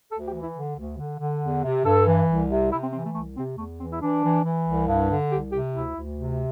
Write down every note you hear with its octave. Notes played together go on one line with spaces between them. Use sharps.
D2 A4
G4
E3
E4
D3
D2
D3
D3
E2
C3
G2 A4
E3
C2
C3
C3 E4
C4
E3 C4
A3
C2 A3
C3 C4
E2 A3
E3 C4
E4
E3 D4
E3
E3
C2
G2
D3
C2 G4
C3 G4
D2 E4
D2
C3